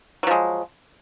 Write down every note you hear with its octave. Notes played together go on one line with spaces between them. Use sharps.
F3 F#3 G#3